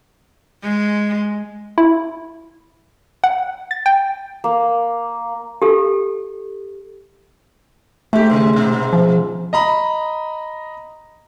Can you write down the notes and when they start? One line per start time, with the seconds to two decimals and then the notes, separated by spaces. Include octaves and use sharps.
0.63 G#3
1.78 E4
3.24 F#5
3.71 A6
3.86 G5
4.44 A#3
5.62 G4 A4
8.13 G#2 A3 G4
8.30 D#2 C#3 G#3
8.53 G#2 B2
8.93 F3
9.53 D#5 A#5 B5